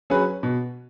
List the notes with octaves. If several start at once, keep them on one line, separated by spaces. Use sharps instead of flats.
F#3 C#4 G#4 B4
B2